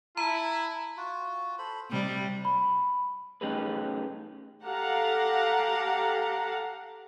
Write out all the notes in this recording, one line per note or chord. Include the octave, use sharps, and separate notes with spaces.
E4 A5 A#5
F4 F#4
A4 C5 B5
C3 G3 D#4
B5
A3 C#4 D#4 G4 G#4 B4
G4 A4 F5 F#5 A#5